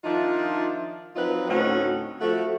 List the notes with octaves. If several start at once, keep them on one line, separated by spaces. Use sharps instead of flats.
D#3 F3 D4 D#4 F4 E5
F3 F#3 C4 D#4 F4 B4
D2 A2 C4 C#4 D#4 F#4
F3 A3 E4 F#4